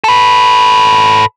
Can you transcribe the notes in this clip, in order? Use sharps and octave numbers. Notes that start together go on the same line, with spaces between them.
A4 B4